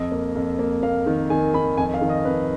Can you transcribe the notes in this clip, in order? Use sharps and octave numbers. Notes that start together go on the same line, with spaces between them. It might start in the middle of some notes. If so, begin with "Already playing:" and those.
Already playing: F2 D#5
A#3
F2
A#3
A#3 F5
D#3
D#3 G#5
D#3 B5
F2 G#5
F5
D#3
D#5
F2 B4